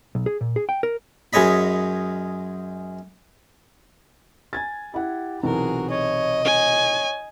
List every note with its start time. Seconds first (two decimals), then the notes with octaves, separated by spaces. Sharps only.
0.15 B1
0.26 G#4
0.41 A#2
0.56 G#4
0.69 G5
0.83 A#4
1.33 F#2 G#3 C#5 D#5 B5
4.53 G#5 G#6 A6
4.94 E4 G4 F#5
5.43 B1 C3 E3 F#4 G#4 A#4
5.90 C#5 D#5
6.45 C#5 G#5